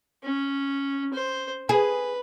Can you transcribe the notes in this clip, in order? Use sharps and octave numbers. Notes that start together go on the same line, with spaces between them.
C#4
C5
G#4 B4